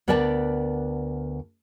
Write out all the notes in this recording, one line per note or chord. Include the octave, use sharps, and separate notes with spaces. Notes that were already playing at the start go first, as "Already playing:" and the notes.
D2 B3 A#4 D5 G5 A5